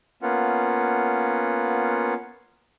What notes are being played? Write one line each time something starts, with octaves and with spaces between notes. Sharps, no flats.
A#3 B3 C#4 F4 F#5